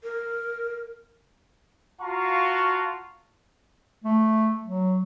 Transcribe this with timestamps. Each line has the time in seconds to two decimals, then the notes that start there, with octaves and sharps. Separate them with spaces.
0.03 A#4
2.02 F4 F#4 F5 A5 A#5 C#6
4.04 A3
4.63 F#3